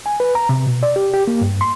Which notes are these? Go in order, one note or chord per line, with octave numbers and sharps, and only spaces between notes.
G#5
B4
A#5
C3
B2
D5
G4
G4
A#3
G2
C6